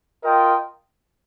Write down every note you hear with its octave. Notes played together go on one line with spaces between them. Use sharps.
F4 A#4 D#5 G5